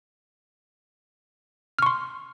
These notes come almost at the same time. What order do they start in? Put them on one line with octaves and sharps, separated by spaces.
F6 C#6 C6